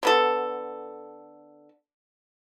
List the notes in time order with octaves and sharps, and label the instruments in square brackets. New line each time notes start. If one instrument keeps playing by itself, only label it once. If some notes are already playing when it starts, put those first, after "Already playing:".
[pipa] D3 B3 A4